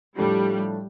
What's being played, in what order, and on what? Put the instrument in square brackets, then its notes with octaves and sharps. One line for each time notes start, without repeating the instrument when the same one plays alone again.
[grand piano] A2 F3 A3 D4 A4 [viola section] G3